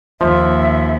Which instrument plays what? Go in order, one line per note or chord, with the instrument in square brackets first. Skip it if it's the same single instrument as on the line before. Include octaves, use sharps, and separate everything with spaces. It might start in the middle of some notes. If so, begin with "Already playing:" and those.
[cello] D#2 [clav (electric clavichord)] F3 [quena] E5